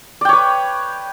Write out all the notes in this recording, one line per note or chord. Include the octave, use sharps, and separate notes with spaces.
B4 C#5 D5 G5